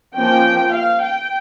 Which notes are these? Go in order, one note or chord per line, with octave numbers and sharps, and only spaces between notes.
F3 A#3 C#4 G5
F5
G5